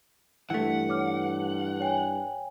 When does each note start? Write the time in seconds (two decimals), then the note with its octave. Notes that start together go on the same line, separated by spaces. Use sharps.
0.50 G2 E3 A3 F#5
0.89 C#5 D6 F6
1.80 C#5 G5 G#5